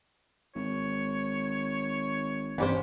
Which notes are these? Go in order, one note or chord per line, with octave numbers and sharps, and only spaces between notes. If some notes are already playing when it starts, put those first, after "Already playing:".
G#1 C#5
E2 G2 C3 C#4 G4 C5